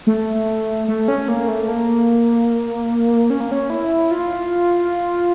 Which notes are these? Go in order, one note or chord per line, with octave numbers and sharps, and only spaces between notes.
A3
A3
C#4
A#3
A3
A#3
C#4
A#3
C#4
E4
F4